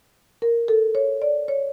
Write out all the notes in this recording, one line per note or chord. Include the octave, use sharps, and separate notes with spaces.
A#4
A4
C#5
D5
C#5